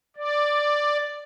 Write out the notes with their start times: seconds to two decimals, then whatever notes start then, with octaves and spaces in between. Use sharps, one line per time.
0.17 D5